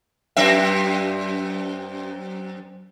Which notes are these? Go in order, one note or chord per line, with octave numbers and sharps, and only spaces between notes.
F#2 C4 E5